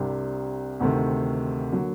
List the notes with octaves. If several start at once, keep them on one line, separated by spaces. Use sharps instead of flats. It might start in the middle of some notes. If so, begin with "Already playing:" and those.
Already playing: C2 C3 G3 D4
D2 C3 D#3 A3
D3 F#3 A#3